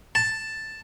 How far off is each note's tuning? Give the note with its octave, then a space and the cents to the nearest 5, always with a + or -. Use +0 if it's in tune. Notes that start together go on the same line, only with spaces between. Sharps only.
A5 +5